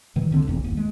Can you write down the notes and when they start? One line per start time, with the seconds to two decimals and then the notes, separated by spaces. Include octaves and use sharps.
0.16 A2 D#3 E3 F#3
0.31 C#2 D3 C4
0.46 F1 B1 E2
0.64 G1 D#2
0.77 G#3